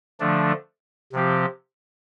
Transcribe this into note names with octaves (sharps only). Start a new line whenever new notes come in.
D3 F3 A3 D4
C3 F3 C4 G4